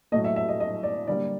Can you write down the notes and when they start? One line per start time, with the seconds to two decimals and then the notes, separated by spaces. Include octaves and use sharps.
0.12 A2 F#3 A3 D#5
0.24 E5
0.36 E5
0.49 D#5
0.60 D#5
0.83 D5
1.07 D3 G3 A#3 D5